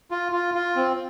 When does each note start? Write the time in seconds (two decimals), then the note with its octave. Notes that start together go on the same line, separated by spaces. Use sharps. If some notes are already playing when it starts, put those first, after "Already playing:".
0.11 F4
0.32 F4
0.54 F4
0.76 C4